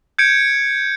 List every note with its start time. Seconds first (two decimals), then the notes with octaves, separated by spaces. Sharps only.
0.19 G6 G#6 C#7 D7